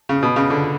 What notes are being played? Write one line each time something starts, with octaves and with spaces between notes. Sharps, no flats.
C#3
B2
C#3
D3